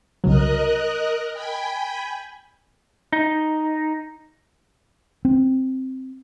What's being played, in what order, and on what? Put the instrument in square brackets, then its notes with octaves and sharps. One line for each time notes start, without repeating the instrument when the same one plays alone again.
[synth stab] C2 C#3 F#3 [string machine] A#4 D#5 F#6
[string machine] G5 G#5 B5
[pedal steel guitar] D#4
[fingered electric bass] C4